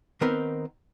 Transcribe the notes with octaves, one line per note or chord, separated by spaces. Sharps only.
D#3 B3 C4 D#4 A#4 B4